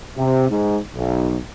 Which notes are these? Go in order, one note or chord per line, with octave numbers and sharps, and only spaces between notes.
C3
G#2
B1